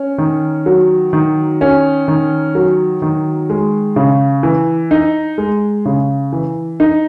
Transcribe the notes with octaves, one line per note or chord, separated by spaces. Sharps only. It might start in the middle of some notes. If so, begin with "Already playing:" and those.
Already playing: C#4
D#3
F#3
D#3
C#4
D#3
F#3
D#3
G#3
C#3
E3
D#4
G#3
C#3
E3
D#4